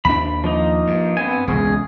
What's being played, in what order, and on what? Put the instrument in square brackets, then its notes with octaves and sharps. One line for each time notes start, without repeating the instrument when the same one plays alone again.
[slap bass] D#2 D4 [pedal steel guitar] B5
[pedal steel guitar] F3 A#3 D#4
[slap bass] G2
[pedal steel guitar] B3 C4 G#5
[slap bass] E1 C#2 [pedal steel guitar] G#4